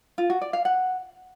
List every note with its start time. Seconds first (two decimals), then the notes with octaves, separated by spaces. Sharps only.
0.18 F4
0.30 F#4
0.41 D5
0.53 F5
0.65 F#5